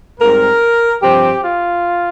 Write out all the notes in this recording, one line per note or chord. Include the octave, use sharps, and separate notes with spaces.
G#2 G3 C4 A#4
G2 F3 C4 G4
F4